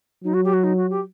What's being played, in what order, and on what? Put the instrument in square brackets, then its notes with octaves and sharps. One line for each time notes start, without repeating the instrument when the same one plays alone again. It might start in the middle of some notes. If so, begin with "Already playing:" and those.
[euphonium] F#3 [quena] D#4
[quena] F#4
G4
F#4
D#4
F#4
G4